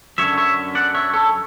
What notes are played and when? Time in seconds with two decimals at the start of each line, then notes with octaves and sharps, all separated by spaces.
0.18 F#2 D3 C#5 E5
0.37 C#5 E5
0.75 D5 F#5
0.95 C#5 E5
1.13 A4 C#5